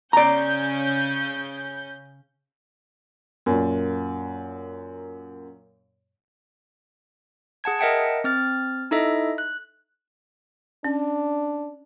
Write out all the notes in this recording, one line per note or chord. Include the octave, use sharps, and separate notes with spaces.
C#3 C#4 D5 A#5 G6
F#2 A#2
G#4 F#5 A5 G#6
A#4 D#5 E5 F#5 G5 A5
C4 F6 A6
D#4 E4 A4 D#5 E5
F#6
C#4 D4